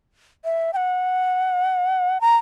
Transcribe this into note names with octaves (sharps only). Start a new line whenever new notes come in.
E5
G5
F#5
A#5